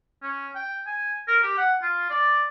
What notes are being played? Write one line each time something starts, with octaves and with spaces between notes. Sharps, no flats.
C#4
G5
G#5
A#4
G4
F#5
F4
D5